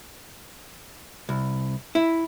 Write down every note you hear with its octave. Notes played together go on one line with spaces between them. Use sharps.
C2
E4